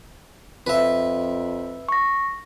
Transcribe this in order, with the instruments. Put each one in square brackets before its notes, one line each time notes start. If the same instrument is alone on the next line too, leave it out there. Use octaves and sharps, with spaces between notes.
[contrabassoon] F2 [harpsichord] B4 E5
[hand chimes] C#6 A#6